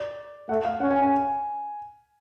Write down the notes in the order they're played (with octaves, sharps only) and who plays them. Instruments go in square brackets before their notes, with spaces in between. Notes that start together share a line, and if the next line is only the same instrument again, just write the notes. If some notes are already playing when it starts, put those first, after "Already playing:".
Already playing: [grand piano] D5
[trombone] A3 [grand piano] F#5
[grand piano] F5
[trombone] C#4 [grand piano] F#5
[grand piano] G#5
G#5